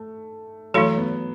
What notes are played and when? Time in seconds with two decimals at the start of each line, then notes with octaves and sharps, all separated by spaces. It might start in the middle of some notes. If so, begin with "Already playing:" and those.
Already playing: A3
0.74 E3 F#3 A3 E4 A4
0.98 B3